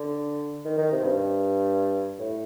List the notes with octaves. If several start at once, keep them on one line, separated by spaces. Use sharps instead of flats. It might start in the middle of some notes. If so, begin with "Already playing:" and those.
Already playing: D3
D#3
D#3
C3
G2
A2